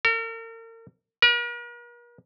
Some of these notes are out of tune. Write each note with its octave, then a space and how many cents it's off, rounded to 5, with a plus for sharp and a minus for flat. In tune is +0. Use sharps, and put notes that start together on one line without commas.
A#4 -40
A#4 +45